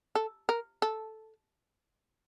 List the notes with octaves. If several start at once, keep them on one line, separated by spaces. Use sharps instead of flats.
A4
A#4
A4